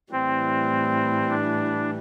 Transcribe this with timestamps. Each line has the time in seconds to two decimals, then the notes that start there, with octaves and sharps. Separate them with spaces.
0.12 A2 E3 G3 C4
1.29 D4